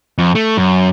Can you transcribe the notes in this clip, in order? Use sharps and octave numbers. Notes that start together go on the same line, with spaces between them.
F2
A3
F#2